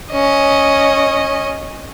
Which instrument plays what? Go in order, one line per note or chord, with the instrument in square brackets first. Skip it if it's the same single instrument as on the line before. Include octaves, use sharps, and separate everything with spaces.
[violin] C#4 D#5